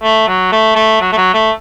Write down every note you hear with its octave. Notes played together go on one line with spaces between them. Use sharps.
A3
F#3
A3
A3
F#3
A3
F#3
A3